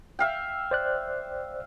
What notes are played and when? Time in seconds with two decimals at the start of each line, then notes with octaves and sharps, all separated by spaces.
0.19 E5 F5 G5
0.71 C5 D5 F#6